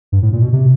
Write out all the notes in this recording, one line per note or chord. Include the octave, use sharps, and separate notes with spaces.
G2
A2
A#2
B2
C3